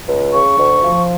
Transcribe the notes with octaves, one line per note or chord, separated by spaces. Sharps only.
C#2
C#3 C#6
D2
F3